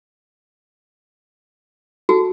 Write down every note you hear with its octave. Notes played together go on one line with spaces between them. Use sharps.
F#4 A4